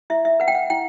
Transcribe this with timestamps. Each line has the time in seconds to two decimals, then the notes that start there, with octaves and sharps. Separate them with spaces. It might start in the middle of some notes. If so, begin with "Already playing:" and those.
0.10 E4 E5
0.25 E5
0.40 B4 F#5
0.48 G5
0.55 F#5
0.70 E4 G5